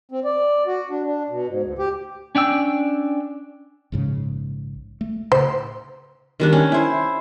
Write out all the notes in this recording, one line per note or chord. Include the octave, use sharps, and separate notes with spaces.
C4
D5
F#4
D4
D4
B2
G#2
D2
G4
C#4 D4 G5 E6
A#1 G#2 C#3
A3
A2 C#3 C5
D#3 G3 D4
C#4
E4 C5